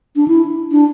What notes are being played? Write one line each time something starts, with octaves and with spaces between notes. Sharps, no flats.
D4
E4
D4